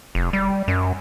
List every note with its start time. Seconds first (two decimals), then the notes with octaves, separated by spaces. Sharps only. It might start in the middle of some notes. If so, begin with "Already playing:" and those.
0.15 F1
0.33 G3
0.68 F#2